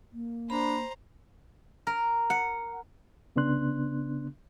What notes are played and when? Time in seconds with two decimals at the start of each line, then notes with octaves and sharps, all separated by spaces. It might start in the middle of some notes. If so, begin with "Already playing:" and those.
0.13 A#3
0.50 D4 C5 A#5 B5
1.87 A#4
2.30 F#5
3.36 C2 C#3 B3 D4 C6 F#6